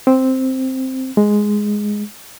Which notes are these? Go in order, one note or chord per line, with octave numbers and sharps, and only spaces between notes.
C4
G#3